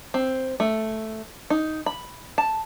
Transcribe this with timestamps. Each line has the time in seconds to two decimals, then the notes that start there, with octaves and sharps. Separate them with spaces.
0.14 C4
0.60 A3
1.50 D#4
1.86 B5
2.38 A5